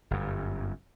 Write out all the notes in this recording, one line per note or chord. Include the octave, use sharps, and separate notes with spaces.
G1 F#2